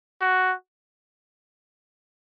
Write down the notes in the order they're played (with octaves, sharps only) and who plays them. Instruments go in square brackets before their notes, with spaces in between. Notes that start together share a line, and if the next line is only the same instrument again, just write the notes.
[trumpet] F#4